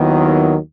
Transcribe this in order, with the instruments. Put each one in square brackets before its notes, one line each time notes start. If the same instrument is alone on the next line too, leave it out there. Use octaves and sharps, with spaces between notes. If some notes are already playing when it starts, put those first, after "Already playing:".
Already playing: [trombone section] D#2 D#3 F#3 B3 E4